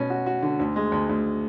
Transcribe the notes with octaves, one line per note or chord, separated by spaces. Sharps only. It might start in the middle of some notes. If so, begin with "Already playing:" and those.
Already playing: B2 C#4
F#4
F#4
D3
D2
G#3
D2
D2